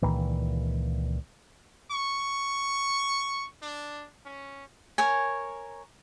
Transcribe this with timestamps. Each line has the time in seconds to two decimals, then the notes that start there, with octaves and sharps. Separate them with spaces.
0.02 C#2 A#2 D#3 E3
1.91 C#6
3.62 D4
4.25 C#4
4.98 A#4 C#5 G#5